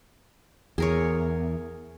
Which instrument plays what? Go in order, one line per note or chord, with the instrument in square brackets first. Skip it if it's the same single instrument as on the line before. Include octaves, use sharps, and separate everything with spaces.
[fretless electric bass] E2 [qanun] G#4 A#4 C#5